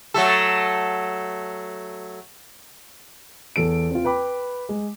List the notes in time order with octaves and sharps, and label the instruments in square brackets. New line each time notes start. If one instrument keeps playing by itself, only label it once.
[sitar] F#3 A3 A4
[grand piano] E2 A4 D7
C4 F4
B4 G5 B5 D6
G#3